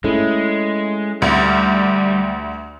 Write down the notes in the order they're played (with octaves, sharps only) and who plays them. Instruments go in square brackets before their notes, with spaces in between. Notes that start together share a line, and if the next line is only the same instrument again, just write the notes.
[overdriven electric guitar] G#3 [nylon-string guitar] A3 C#4 E4
[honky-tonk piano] D2 [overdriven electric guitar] G3